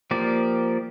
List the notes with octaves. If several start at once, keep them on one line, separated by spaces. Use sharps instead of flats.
F3 A#3 G4 D5